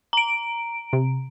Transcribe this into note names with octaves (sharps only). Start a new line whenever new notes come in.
A#5 D7
C3